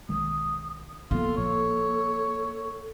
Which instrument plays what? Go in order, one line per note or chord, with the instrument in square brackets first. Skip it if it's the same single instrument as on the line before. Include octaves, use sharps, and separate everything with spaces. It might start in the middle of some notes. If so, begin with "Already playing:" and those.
[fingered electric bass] B1 D#3 G#3 [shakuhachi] D#6
[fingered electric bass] F3 B3 [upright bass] A#3 [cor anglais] F4 [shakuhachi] A4
[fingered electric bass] A1 A#2 F3 [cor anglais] C#5